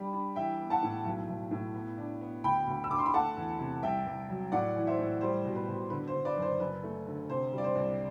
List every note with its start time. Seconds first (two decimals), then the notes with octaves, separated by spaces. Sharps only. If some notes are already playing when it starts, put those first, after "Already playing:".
Already playing: G3 D4 B5
0.13 D4
0.36 E3 E5 G5
0.60 B3
0.70 F#5 A5
0.83 A2
1.05 B1
1.28 B1
1.51 A2
1.74 B3
1.98 D4
2.21 B3
2.44 D2 G5 B5
2.67 D2
2.84 E6
2.90 D3 D6
2.98 C6
3.06 B5
3.14 A3 F#5 A5
3.36 E2
3.59 C3
3.83 C2 E5 G5
4.06 C2
4.29 F#3
4.52 A2 D5 F#5
4.75 E3
4.87 C5 E5
4.99 A2
5.21 G3 C5
5.45 B2
5.56 B4
5.68 B2
5.90 D3 B4
6.08 C5
6.14 D3
6.25 B4 D5
6.37 F#1
6.42 C5
6.60 F#1 B4
6.83 A3
7.07 D3
7.29 C3 C5
7.52 G3
7.58 D5
7.64 C5
7.75 C2